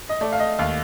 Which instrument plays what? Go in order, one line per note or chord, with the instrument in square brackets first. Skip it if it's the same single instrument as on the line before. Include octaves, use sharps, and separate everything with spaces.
[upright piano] D#5
[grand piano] A3 [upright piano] D5
[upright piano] F5
D#5
[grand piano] D#2 [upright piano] F5